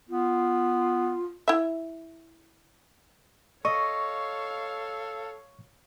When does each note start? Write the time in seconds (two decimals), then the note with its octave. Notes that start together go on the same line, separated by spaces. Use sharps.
0.09 B3 F4
1.48 E4 E5
3.65 A4 C#5 D#5 F5 C#6